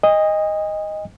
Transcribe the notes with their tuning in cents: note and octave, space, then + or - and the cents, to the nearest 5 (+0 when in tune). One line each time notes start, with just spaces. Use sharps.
D#5 +0 G#5 -45